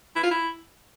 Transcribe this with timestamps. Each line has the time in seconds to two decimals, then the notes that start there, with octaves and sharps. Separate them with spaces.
0.16 E4
0.23 F4
0.31 E4